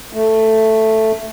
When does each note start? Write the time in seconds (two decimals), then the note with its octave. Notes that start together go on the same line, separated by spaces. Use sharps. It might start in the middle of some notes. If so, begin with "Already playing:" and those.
0.13 A3